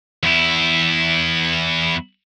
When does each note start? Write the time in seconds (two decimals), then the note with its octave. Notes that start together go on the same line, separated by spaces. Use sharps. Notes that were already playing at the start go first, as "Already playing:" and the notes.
0.23 E2 E4